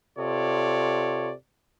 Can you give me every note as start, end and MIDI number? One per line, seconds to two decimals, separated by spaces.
0.18 1.33 48
0.18 1.33 65
0.18 1.33 69
0.18 1.33 73
0.18 1.33 74